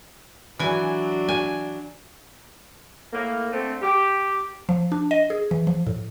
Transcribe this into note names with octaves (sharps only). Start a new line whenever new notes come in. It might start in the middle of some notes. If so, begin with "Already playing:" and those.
E3 F#3 D4 G#5
G#5
A2 A#3
D3 A3 C4
G4
F3
D4
D#5
G#4
E3
F3
A2